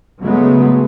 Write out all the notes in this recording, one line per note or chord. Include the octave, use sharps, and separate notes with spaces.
C#3 F#3 G#3 A3 B3